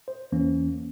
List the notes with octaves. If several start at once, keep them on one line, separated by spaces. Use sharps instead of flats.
C5
E2 E3 A#3 C#4